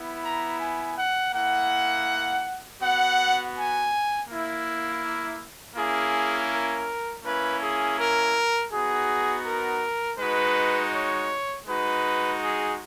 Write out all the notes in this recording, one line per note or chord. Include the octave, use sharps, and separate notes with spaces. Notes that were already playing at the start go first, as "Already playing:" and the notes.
Already playing: B3 E4
A#5
G#5
F#5
A#3 E4 F#5
B3 F#4 F#5
G#5
A#3 E4
A#3 C#4 E4 G#4
A#4
A#3 C#4 E4 B4
G#4
A#4
B3 D#4 F#4 G#4
A#4
G#3 D#4 F#4 B4
C#5
G#3 D#4 F#4 B4
G#4